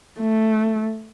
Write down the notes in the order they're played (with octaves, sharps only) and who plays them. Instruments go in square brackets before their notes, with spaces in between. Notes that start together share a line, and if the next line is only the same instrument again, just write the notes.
[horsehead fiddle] A3